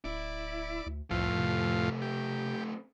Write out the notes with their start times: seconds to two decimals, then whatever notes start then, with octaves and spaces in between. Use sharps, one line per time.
0.04 D1 E4 D5
0.86 D2
1.11 C2 F2 A2 A3 C4 F4
1.38 C3
2.02 G4